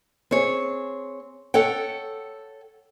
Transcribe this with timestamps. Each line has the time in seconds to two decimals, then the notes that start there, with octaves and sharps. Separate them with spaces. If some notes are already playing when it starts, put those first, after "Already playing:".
0.31 C4 G#4 C#5
1.54 A4 C#5 F#5 G5